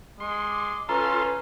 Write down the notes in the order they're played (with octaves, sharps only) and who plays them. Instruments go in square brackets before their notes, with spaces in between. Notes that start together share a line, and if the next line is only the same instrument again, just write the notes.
[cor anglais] G#3 [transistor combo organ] C6
[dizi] D6
[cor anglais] C#4 [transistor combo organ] F4 A4 C6 [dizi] B4 [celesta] A#5